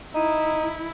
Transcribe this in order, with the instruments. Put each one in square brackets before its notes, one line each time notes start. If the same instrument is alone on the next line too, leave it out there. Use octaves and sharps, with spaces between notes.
[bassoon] D#4 [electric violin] E4